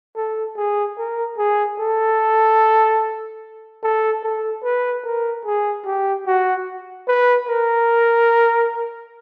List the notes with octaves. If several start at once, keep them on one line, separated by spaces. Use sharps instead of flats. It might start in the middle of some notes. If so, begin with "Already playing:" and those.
A4
G#4
A#4
G#4
A4
A4
A4
B4
A#4
G#4
G4
F#4
B4
A#4